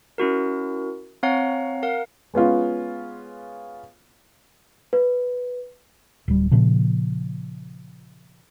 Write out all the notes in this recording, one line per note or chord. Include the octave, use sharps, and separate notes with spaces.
C#4 E4 F#4 A#4
C4 C#5 F5 F#5 A#5
A#4 F5 F#5
G#3 B3 C#4 F4
B4
D1 G3
A#2 C#3 F3